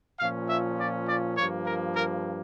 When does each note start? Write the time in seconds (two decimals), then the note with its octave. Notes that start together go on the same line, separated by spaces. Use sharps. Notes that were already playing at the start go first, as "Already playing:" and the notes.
0.19 A#2 F3 C#4 F5
0.48 E5
0.79 D5
1.08 D5
1.37 G2 F3 A#3 C#5
1.66 A#4
1.95 A#4